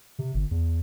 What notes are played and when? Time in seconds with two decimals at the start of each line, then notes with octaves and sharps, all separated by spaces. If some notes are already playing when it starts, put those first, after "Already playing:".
0.19 C3
0.34 G1
0.51 E2